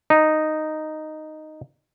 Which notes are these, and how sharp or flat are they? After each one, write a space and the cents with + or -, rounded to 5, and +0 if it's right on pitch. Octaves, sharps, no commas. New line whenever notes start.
D#4 -5